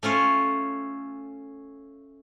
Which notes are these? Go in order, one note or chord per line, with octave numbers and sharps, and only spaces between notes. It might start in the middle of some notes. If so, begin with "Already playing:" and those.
A3 C#4 F4 C#5